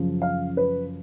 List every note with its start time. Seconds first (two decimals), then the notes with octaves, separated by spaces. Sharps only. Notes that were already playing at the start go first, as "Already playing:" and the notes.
Already playing: F#2 C#3 F3
0.22 F5
0.57 B4